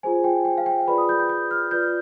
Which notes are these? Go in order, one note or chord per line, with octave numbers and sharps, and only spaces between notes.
F4 G#4 C5 G#5
G5
G5
F5
G5
F4 G#4 B4 D5 B5
D#6
G6
G6
G6
F6
F4 B4 D5 G6